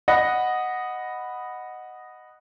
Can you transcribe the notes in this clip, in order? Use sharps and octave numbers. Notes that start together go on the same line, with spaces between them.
D#5 F#5 B5 A#6